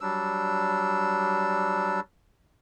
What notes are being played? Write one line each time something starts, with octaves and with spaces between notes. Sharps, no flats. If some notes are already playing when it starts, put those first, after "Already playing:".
F#3 G3 D4 E6